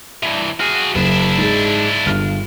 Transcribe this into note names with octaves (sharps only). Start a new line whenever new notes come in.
G2 E3
F#4 G#4 F6
F#1 D4 E4
G#2 G#3
G1 G2 F6